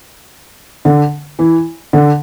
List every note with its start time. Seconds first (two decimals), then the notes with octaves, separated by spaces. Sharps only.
0.85 D3
1.39 E3
1.93 D3